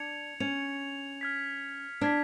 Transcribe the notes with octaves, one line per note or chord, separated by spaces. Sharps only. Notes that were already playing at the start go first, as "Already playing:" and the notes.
Already playing: D4 G#6 C#7 F7
C#4 G#6 C#7 F7
F6 G#6 B6
D4 F6 G#6 B6